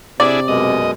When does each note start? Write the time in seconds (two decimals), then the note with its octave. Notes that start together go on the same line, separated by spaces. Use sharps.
0.20 C3 D4 E4 G#4 D5
0.48 F#2 B2 G#3 D#5